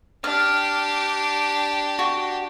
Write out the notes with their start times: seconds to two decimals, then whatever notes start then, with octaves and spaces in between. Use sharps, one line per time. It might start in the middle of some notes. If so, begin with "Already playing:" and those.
0.24 D4 G4 F6
1.99 F#4